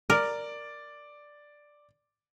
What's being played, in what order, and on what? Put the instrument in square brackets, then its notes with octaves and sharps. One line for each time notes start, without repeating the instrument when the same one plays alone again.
[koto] A#4 [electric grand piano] D5 D6